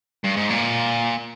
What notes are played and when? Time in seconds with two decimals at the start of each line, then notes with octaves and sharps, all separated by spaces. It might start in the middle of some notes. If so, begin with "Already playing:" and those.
0.24 G2
0.37 G#2
0.50 A#2